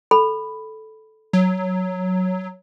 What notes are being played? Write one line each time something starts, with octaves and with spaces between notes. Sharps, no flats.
A4 B5
F#3